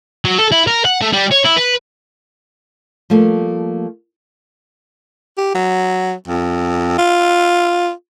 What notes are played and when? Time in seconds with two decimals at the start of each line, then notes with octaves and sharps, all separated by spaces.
0.25 F#3
0.38 A4
0.52 E4
0.67 A#4
0.85 F#5
1.01 A3
1.13 G3
1.31 C#5
1.44 E4
1.56 B4
3.10 F3 G3 A3 A#3
5.38 G4
5.55 F#3
6.28 F2
6.98 F4